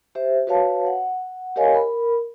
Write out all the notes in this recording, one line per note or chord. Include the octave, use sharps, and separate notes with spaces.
G4 C5 E5
F#4 B4 C#5 F5 A5
F#5
G4 A#4 C#5 D#5 F5 G#5
A#4 B5